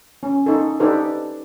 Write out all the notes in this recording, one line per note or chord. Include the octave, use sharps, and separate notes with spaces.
C#4
D#4 A4
D4 D#4 G4 A4 B4 C5